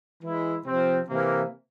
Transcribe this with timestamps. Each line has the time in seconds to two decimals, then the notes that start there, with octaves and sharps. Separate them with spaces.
0.22 E3 G#3 E4
0.65 C3 F3 C4
1.08 C3 E3 A#3